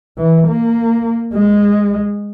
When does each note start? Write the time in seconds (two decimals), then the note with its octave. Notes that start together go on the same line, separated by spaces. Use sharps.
0.18 E3
0.47 A#3
1.34 G#3